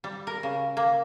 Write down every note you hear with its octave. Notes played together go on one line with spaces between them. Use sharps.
G3
A#4
C#3
A#3